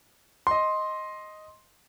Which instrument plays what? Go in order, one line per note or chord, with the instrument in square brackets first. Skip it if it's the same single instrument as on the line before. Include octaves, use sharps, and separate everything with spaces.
[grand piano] D#5 C6